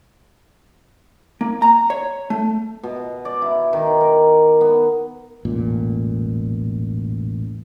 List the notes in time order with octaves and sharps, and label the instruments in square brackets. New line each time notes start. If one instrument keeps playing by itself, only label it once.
[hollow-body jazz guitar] A#3
A#5
C#5
A3
[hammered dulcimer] B2
D5
E4
D#3
A#4
B3
[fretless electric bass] E1 A1 A#2